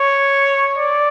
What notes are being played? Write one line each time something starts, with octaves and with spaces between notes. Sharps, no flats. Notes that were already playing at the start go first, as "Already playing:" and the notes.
Already playing: C#5
D5